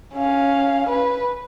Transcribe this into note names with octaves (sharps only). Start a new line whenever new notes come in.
C#4 F5
B4